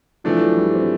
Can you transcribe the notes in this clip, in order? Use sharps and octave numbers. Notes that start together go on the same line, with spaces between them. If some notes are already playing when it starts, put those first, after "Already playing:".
E3 F3 A3 D4
F#3
G3
C4